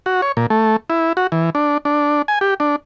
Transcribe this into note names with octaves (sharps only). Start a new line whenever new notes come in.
F#4
C#5
A#2
A3
E4
F#4
E3
D4
D4
G#5
G4
D4